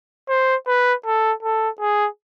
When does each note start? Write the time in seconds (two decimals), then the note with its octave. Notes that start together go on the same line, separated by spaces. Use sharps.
0.29 C5
0.67 B4
1.06 A4
1.43 A4
1.80 G#4